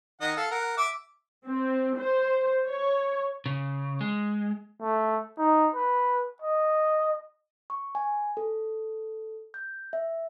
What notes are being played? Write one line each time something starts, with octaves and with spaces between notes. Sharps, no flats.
D#3 D#5 F#5
A4 F5
A#4 F#5
E5 D6
C4
C5
C#5
C#3
G#3
A3
D#4
B4
D#5
C#6
G#5
A4
G6
E5